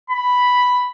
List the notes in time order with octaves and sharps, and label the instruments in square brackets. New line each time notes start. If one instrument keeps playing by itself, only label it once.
[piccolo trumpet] B5